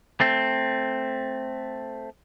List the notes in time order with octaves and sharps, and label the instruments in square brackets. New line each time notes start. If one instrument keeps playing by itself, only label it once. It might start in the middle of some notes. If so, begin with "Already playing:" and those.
[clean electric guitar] A3 C4